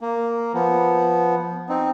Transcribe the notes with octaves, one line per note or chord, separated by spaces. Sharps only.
A#3
F3 B3
C4 D#4